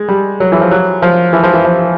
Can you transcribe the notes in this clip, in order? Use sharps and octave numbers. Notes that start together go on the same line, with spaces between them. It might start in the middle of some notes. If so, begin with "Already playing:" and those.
Already playing: G#3
G3
F#3
E3
F3
F#3
F3
E3
F3
E3
F3